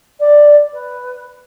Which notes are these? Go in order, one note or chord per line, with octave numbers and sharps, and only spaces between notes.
D5
B4